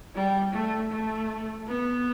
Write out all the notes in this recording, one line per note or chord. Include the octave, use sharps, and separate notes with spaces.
G3
A3
A3
B3